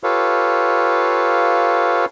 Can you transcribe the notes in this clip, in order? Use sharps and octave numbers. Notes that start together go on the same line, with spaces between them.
F4 G4 A4 B4 C#5 F5